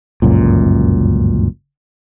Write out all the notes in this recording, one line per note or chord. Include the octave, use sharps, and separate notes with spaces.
G1 C#2 F#2 A#2